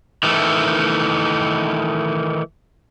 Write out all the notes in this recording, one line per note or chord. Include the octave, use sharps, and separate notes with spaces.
D#3 E3 A3